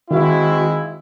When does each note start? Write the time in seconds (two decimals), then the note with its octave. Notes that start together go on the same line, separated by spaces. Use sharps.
0.11 D#3 G#3 C4 E4 F#4 F5